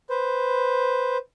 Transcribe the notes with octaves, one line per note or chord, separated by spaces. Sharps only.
B4 C5